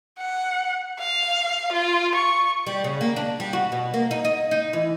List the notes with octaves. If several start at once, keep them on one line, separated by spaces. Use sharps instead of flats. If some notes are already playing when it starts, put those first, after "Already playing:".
F#5
F5
F4
C#6
G3
C#3
A#3
D4
G3
F#4
B2
A#3
D#4
D#5
D#4
E3